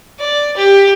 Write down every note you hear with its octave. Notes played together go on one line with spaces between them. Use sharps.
D5
G4